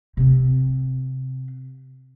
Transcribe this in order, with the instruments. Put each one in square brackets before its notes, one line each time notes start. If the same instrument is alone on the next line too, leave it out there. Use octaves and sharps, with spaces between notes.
[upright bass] C3 C4